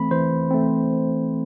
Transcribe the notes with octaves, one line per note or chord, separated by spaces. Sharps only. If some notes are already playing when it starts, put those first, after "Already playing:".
Already playing: E3 A3 C4 B5
E3 C5
A3 C4